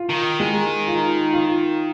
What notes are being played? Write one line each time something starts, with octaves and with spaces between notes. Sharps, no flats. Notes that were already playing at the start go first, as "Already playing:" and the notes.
Already playing: F4
D#3
G#3
F4
F4